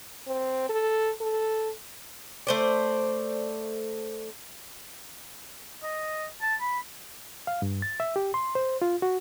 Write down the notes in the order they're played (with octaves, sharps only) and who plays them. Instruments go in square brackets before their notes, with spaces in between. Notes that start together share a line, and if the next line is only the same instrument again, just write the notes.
[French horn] C4
A4
A4
[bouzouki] A3 C5 D5
[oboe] D#5
A5
B5
[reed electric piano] F5
G2
A6
E5
G4
C6
C5
F4
F#4